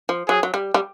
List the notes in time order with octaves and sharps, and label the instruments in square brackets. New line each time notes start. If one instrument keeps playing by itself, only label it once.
[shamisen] F3
[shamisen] F#3 [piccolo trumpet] G#4
[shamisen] F#3
G3
G3